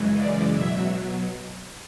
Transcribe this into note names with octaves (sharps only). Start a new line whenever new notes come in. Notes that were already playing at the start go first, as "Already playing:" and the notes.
Already playing: F#2 C#3 E3 G#3
D5
B2 F#3 E5